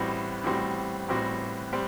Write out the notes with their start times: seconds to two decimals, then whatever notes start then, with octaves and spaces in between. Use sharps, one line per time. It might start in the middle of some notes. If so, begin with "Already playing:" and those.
Already playing: A1 A2 G3 C4 F#4
0.44 A1 A2 G3 C4 F#4
1.08 A1 A2 G3 C4 F#4
1.73 G3 C4